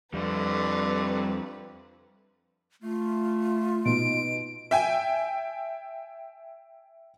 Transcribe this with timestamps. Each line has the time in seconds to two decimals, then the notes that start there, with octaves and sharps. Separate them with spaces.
0.14 F2 D3 G3 C4 B4
2.83 A3 F4
3.85 B2 D#4 D7
4.71 E5 G5 G#5